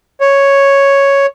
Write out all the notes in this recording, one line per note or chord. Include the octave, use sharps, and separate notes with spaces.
C#5